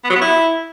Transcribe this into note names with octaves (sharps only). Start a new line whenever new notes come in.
B3
F#3
B3
E4